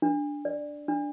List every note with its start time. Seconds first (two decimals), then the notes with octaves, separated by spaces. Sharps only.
0.02 D4
0.45 D5
0.88 D4